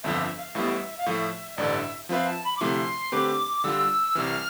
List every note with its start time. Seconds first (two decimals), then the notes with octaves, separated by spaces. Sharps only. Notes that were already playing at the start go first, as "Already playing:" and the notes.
0.03 G1 F2 D3 F3 E5
0.20 E5
0.38 F5
0.55 A1 A2 G3 B3 E5
0.97 F5
1.06 A2 F3 A3 E5
1.57 A1 G2 D3 D5
1.75 E5
2.09 F3 C4 F4 B4 E5 F5
2.26 A5
2.44 B5
2.57 D6
2.60 D2 C3 F3 A3 E4 C6
3.12 D3 A3 C4 G4 B4 D6
3.64 D3 G3 D4 F4 E6
4.15 C2 C3 E3 F6